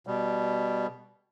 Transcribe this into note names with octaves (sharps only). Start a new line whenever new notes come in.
B2 G3